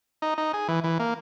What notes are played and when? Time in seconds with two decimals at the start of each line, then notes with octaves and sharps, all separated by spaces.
0.22 D#4
0.38 D#4
0.53 G#4
0.68 E3
0.84 E3
1.00 A#3